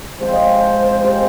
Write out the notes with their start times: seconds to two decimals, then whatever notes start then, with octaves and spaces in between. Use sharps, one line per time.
0.20 F3 G#3 C4 G#4 C5
0.34 D#5
0.47 C5
1.01 C3 G#3 F4 A#4